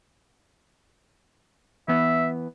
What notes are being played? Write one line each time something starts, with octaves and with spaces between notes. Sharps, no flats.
E3 B3 E5